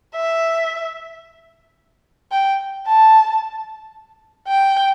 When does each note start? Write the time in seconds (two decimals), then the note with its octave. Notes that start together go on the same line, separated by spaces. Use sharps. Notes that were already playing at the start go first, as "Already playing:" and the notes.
0.15 E5
2.32 G5
2.86 A5
4.48 G5